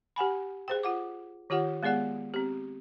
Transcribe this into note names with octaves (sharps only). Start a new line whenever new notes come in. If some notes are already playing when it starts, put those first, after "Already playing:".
G4 F#5 G#5 B5
G#4 C5 G5
F4 F#5 D6
D#3 F4 G4 C#5 F#5
G#3 B3 G#4 D5 F#5
C4 G4